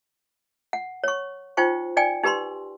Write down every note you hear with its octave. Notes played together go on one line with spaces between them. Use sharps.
F#5
C#5 C#6
D#4 F4 C5 G5 C#6
D#4 D5 G5 G#5
D#4 G4 B4 B5 C6